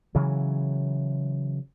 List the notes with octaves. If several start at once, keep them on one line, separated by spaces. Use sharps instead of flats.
C#3 E3 F#3